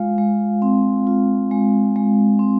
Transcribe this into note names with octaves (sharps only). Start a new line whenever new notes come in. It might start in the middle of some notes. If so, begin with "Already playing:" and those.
Already playing: G#3 F4 F5
G#3
C4
F4
G#3
G#3
C4